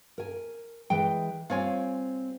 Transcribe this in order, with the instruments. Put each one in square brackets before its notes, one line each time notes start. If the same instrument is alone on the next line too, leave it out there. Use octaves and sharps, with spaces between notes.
[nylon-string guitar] A#4 G#5
[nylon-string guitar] E3 G#3 [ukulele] G5
[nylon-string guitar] G3 C4 F5 [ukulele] F4 C#5 G#5